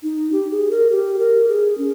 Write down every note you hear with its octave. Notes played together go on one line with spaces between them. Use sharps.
D#4
G4
G#4
A#4
G4
A#4
G#4
C#4